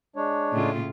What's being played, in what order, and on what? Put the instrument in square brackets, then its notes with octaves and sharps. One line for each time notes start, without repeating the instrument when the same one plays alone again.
[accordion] G#3 D4 C#5
[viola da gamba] A2 C#3 F4